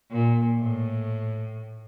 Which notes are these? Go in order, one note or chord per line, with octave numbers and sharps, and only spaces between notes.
A#2
A2